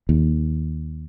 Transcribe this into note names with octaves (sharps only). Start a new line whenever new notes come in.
D#2